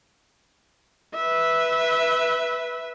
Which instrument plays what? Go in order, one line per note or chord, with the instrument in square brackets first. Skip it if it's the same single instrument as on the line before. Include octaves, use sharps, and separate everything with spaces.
[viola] B4 E5